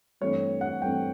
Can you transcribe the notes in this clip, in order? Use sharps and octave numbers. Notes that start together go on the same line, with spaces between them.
G2 E3 A3 C4 C#5
F#5
G2 E3 A3 C4 G5